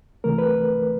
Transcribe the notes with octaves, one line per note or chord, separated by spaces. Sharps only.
C2 C3 E3 A3 A#4
B4